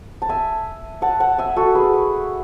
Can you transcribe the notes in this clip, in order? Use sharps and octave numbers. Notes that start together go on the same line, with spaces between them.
A5
E5 G#5
F#5 A5
F#5 A5
E5 G#5
F#4 A4
G#4 B4